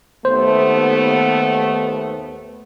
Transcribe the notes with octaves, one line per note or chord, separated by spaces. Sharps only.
D#2 A3 B3 C5